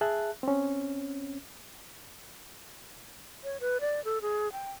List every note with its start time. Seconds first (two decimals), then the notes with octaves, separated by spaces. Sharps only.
0.01 G#4 E5 A5 F#6
0.43 C4 C#4
3.44 C#5
3.60 B4
3.81 D5
4.05 A4
4.22 G#4
4.52 G5